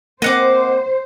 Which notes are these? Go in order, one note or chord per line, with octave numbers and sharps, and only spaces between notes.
A#3 C4 C5 D#5 F#5 D6